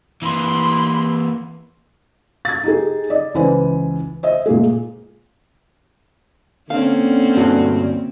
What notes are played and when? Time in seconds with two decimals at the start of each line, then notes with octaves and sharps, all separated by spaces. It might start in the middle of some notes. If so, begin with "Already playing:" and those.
0.22 E3 A#3 B5 C6
2.45 G#6 A6
2.64 D#4 G4 G#4
3.10 D5 D#5
3.34 C#2 E3 B4 C5 G#5
4.23 C5 D#5 E5
4.46 A#2 G#3 A#3 G#4
6.70 D3 A#3 C4 C#4 F5
7.36 D2 G2 F#4